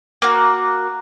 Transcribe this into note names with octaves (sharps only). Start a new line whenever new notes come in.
A#3 F#4